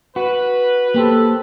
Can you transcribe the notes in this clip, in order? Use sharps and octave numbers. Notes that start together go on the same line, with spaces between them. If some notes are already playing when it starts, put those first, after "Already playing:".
F#4 B4
A#3 G4 A4 C5